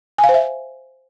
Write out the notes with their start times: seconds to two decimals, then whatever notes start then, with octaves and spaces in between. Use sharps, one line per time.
0.18 G#5
0.24 F5
0.29 C5
0.34 E5